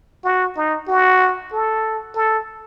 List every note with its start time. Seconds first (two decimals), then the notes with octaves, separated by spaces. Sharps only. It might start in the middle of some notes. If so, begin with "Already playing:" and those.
0.25 F#4
0.56 D#4
0.88 F#4
1.53 A4
2.16 A4